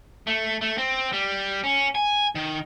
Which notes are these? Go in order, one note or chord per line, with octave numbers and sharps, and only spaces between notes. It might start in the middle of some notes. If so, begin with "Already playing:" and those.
A3
A3
C4
G3
C#4
G#5
D#3